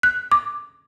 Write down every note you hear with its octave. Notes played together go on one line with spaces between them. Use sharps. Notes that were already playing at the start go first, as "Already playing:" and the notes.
F#6
D6